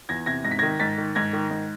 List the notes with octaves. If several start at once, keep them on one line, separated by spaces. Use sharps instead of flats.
E2 G#6 A#6
C3 G#6 A#6
G#2 A#6
B6
G#6 A#6
D#3
G#2 A6 B6
D#3
G#2 G#6 A#6
D#3
G#2